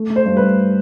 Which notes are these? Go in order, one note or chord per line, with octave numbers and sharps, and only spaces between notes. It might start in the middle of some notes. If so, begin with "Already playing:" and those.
Already playing: A3
A3
C5
G2
B4
G2